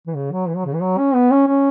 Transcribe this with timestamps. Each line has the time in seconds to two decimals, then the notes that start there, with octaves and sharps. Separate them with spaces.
0.07 E3
0.15 C#3
0.32 F#3
0.48 E3
0.56 F#3
0.65 C#3
0.73 E3
0.81 F#3
0.98 C#4
1.14 B3
1.31 C#4
1.47 C#4